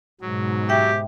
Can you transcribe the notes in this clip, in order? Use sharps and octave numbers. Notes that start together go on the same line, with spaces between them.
G#2 B2 F#3
G4 E5 G5